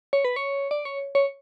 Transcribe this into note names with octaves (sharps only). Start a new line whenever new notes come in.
C#5
B4
C#5
D5
C#5
C#5